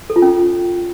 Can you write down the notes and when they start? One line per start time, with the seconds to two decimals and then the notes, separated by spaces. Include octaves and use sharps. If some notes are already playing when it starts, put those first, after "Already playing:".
0.10 A4
0.16 F4
0.22 C#4